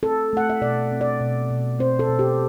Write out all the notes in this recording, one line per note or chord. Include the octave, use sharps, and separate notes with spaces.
C4 A4
A3 F#5
E5
B2 D5
C4
D5
B2
B2
C4 C5
A4
B2
G4